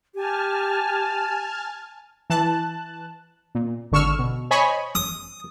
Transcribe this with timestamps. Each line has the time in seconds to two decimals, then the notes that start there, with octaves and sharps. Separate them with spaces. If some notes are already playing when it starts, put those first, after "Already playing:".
0.15 G4 G#5 A5 F6
2.30 E3 A5 F#6
3.55 A#2
3.92 G#1 D3 C#6 E6 F6
4.19 B2
4.51 C5 C#5 D#5 G#5 B5 C#6
4.95 D#6